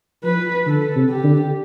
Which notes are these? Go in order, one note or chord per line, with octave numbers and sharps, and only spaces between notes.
F3 B4
D3 A4
C3
G4
D3